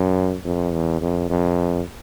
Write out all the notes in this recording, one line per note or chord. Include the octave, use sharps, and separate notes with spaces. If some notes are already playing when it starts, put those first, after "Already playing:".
Already playing: F#2
F2
E2
F2
F2